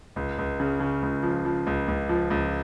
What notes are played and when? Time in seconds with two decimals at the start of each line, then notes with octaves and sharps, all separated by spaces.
0.16 C#2
0.38 C#2
0.60 C#3
0.80 C#3
1.03 C#2
1.23 F3
1.45 F3
1.67 C#2
1.88 C#2
2.09 F3
2.30 C#2